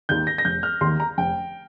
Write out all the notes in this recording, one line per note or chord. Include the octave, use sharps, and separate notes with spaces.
D#2 D#3 G6
A#6
A#6
F1 G6
F6
D#2 D#3 C6
A#5
F1 G5